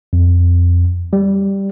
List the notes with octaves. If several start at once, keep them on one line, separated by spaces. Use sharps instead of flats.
F2
G3